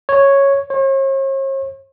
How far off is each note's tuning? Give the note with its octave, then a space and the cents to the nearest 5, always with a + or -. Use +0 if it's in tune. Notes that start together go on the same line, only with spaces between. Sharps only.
C#5 -5
C#5 -45